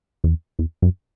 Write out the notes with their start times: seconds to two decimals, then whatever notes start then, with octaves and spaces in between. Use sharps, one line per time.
0.24 E2
0.59 E2
0.82 F#2